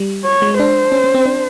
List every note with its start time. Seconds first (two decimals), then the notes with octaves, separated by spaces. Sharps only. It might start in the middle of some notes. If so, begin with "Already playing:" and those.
Already playing: G3
0.25 C#5
0.42 G#3
0.59 D4 C5
0.92 C#4
1.04 C#4
1.14 C4
1.26 D4